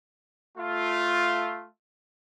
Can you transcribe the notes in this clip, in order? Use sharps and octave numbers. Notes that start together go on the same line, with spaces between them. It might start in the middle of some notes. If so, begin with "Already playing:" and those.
A3 F4